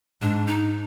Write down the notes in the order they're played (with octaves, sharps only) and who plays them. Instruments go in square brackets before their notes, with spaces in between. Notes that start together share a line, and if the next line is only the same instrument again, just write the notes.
[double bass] G#2 [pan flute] D4
[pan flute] D#4